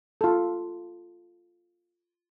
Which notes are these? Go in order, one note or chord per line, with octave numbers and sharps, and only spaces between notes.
F4 A4